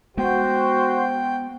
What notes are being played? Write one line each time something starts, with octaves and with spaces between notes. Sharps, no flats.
G#3 B3 F#4 C5 G5